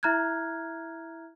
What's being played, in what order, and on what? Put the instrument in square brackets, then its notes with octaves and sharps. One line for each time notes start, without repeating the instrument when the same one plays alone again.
[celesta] E4 E5 A#5 F6 F#6 G#6